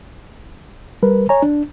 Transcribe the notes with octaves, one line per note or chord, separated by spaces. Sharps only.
G3 A#4 B4
C#5 G#5 A#5
D4